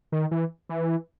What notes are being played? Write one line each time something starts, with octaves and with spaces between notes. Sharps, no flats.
D#3
E3
E3